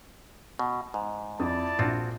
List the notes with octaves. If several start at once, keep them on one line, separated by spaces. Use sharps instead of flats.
B2
G#2
F2 E4 D5 A5 D#6
A#1 C4 D4 F4 F#4